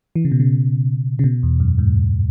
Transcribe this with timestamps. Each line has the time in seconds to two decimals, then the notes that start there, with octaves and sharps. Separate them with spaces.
0.16 E3
0.25 C#3
0.32 B2
0.40 C#3
1.19 C#3
1.24 B2
1.43 E2
1.60 F#2
1.79 G#2